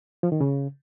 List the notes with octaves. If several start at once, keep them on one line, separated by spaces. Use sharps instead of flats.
F3
D#3
C#3